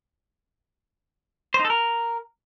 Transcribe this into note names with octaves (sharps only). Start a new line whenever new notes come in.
C5
D#4
A4
A#4